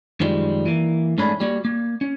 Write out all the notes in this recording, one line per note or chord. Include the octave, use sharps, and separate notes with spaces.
F#2 D#3 F3 G3 G#3
E3 A#3
G#2 A3 C#4 D4 G#4 B5
G3 A#3 F#4
A#3
C#4